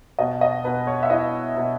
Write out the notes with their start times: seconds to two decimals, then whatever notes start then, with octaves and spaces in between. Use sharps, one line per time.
0.19 B2 D#5
0.41 D#5
0.64 B2 B4
0.87 C#5
1.03 E5
1.10 E4 D#5
1.56 B2